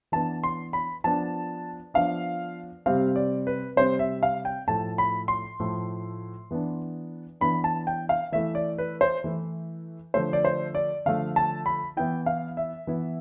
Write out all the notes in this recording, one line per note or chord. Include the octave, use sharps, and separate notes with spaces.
E3 B3 D4 A5
C6
B5
F3 B3 D4 A5
F3 B3 D4 F5
C3 G3 C4 F5
D5
B4
C3 G3 C4 C5
E5
F5
G5
A2 F3 A3 A5
B5
C6
A2 F3 A3
E3 B3 D4
E3 B3 D4 B5
A5
G5
F5
E3 A3 E4 E5
D5
B4
C5
E3 A3 E4
D3 F3 A3 C5
D5
C5
D5
D3 F3 A3 F5
A5
B5
E3 B3 E4 G5
F5
E5
E3 B3 E4